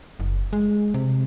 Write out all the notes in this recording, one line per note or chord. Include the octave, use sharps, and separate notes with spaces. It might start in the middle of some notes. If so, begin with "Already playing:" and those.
F#1
G#3
C3